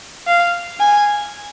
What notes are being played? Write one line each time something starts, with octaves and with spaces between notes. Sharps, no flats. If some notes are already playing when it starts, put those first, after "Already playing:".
F5
G#5